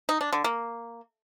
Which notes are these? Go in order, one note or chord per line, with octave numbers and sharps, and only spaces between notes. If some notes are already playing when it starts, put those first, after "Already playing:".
D#4
D4
D3
A#3